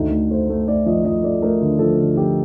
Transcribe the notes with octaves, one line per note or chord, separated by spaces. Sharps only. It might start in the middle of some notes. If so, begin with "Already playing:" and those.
Already playing: D2 D#4
A3
A3 C5
A3
A3 D5
F3 D#5
F3 D#5
A3 D5
A3 A#4
D3
F3 A4
D3
F3 G4